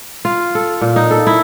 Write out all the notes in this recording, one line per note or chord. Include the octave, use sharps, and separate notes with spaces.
F4
A4
A#2
D#4
A4
E4